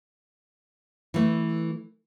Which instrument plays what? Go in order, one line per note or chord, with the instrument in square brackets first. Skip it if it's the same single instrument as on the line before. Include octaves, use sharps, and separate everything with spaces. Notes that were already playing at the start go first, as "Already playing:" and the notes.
[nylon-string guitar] E3 A3